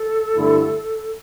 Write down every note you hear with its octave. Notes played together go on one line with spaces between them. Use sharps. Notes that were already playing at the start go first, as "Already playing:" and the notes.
Already playing: A4
G2 D3 A3 E4